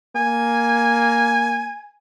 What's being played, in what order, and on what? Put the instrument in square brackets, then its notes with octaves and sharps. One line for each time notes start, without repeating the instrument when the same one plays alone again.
[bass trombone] A#3 [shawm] G#5